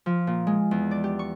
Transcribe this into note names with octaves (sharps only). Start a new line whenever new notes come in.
F3
A#2
G#3
E2
D5
G4
C#6